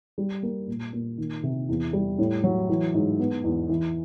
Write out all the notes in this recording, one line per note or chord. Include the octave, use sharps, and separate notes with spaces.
G3
A#3
A#2
A#2
D#3
C3
E2
G3
A2
F#3
E3
G#2
B3
E2
E3